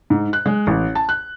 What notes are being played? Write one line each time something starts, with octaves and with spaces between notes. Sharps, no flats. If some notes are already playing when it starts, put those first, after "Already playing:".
G#2
F#6
G#3
A1
A5
F#6